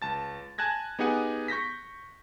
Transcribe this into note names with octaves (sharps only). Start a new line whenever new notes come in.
C#2 A5 A6
G#5 A5 F#6 G#6 A#6
B3 D#4 G4 G#4 F#5 G#5
C#6 G6 A#6 B6